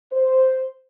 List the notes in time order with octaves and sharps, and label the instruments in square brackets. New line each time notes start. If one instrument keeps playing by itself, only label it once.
[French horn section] C5